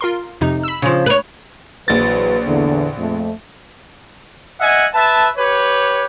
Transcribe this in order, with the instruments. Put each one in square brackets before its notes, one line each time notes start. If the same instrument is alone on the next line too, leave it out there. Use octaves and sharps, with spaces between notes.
[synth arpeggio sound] F4 A#4 C6
F2 C3 D#4
B5 E6
[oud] C#3 F3
B4 C#5
[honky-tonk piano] A#1 A6 [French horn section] E3 F#3 B4
[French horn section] E2 D3
F2 A3
[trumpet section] D#5 E5 F#5 G#5
B4 E5 A5
G4 B4 C#5